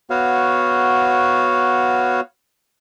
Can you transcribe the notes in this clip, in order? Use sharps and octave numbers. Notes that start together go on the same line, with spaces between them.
B3 F#4 C#5 F5